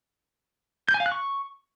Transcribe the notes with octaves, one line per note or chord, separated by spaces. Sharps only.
G6
G#5
F5
F#6
C#6